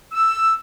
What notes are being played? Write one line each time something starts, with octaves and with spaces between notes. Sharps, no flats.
E6